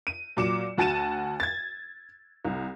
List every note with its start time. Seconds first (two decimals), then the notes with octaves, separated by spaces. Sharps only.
0.07 D#7
0.37 A#2 F#3 D6 C#7 E7
0.78 D2 F#4 A5 A6 D#7 E7
1.40 G#6 A6
2.45 C2